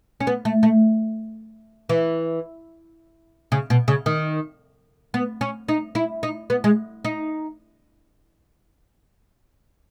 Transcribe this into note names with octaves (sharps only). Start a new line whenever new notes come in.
C#4
B3
A3
A3
E3
C#3
B2
C#3
D#3
B3
C#4
D#4
E4
D#4
B3
G#3
D#4